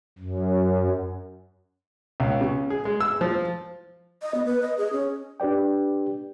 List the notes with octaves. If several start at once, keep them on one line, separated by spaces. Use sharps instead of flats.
F#2
C#2
C#3
G#4
G#3
E6
F3
D#5
B3
B4
D#5
G#4
C#4
D4 G4 B4 D5 G5